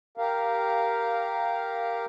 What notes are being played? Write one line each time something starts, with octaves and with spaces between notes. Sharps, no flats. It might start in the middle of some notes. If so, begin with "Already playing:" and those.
G4 A#4 F5